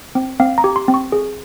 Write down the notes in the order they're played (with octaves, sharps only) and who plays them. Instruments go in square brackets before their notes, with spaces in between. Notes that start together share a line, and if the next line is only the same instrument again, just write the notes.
[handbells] C4
C4 F5
A#5
G4
C6
C4
C#6
G#4